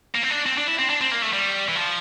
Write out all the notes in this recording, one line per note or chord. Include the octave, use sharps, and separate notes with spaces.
A#3
C4
D4
C4
D4
E4
C4
D4
C4
A#3
A3
G3
E3
F3